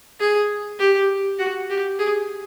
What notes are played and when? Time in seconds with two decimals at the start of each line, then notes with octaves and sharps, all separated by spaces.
0.19 G#4
0.79 G4
1.39 F#4
1.70 G4
1.99 G#4